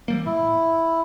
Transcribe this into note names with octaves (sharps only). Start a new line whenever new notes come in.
E3 G3 A#3
A2 E4